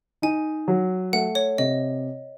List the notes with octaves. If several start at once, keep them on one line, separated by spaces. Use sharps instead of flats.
D#4 G#5
F#3
A3 F#5
C#5
C3 D#5